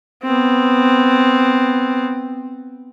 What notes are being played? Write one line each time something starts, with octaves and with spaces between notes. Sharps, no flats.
B3 C4